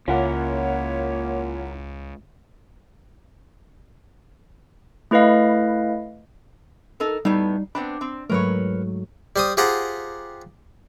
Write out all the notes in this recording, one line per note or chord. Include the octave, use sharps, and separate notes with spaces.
C#2 A#3 C#4 E4 F4 A#4 C#5 F#5
A3 E4 B4 D#5 F5
D#4 A4 A#4
A2 G3 B3 D#4
B3 C4 D4 B5
C4
G#2 F#3 A3 A#4 B4 C#5
G3 C5 D#6
F4 G4 G#4 C5 F#5 A#5